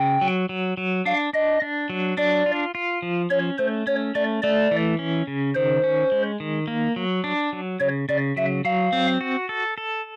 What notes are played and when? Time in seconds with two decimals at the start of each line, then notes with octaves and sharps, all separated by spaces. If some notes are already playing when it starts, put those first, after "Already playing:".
Already playing: C#3 G5
0.21 F#3
0.49 F#3
0.77 F#3
1.05 D4 F5
1.33 D4 D#5
1.62 D4
1.90 F#3
2.17 D4 D5
2.46 F4
2.75 F4
3.02 F3
3.30 C#4 C#5
3.58 A3 C5
3.87 C#4 C#5
4.15 A3 D5
4.42 A3 D5
4.71 E3
4.99 C#4
5.27 C#3
5.55 D#3 C5
5.84 C#4
6.12 G#3
6.40 D#3
6.68 A#3
6.96 F#3
7.24 D4
7.53 F#3
7.80 C#3 C#5
8.09 C#3 D5
8.36 F#3 E5
8.65 F#3 F5
8.93 C4
9.21 F#4
9.49 A4
9.78 A4